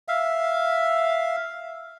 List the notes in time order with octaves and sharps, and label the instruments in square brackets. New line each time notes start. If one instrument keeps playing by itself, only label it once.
[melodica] E5 F5